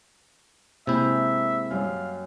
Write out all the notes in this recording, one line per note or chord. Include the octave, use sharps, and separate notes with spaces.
G#2 C3 A#3 E4 E5 G6
F#2 G3 F5